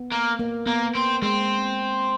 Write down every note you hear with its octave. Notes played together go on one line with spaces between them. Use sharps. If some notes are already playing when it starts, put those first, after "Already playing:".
Already playing: B3
A#3
A#3
A#3 B3
A#3 C4
G#3 C4